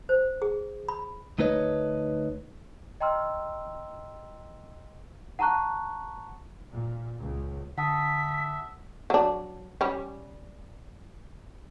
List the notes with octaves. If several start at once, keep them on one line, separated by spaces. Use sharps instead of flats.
C5
G#4
B5
D2 A3 D#4 B4 C#5 D#5
D#5 G5 A#5 C6 E6 F6
F#5 A5 A#5 C#6 F#6
A#2
C#2
D3 E5 F#5 A5 D#6 B6
F#3 D4
G3 C#4